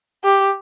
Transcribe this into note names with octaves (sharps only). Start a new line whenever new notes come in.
G4